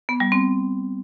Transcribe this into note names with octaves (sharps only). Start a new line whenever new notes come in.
B3
G3
C4